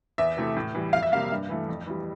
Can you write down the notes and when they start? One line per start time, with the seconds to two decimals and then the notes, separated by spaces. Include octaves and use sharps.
0.18 E2 E5
0.37 C3 E3 A3
0.57 A2
0.75 E3 G3
0.93 F2 F5
1.03 E5
1.12 C3 G3 A#3 F5
1.32 G2
1.49 E3 A3
1.69 F2
1.87 E3 G3